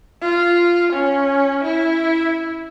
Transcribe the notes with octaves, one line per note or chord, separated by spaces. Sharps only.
F4
C#4
E4